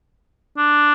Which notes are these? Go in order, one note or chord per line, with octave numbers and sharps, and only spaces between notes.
D4